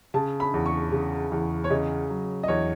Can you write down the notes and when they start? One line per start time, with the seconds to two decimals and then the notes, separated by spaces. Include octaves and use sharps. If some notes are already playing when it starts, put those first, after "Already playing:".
0.14 C#3 A5
0.40 B5
0.54 E2
0.66 C#6
0.92 C#3
1.32 E2
1.64 C#5
1.70 C#3 D#5
2.09 F#3
2.43 D#5
2.48 E2 C#5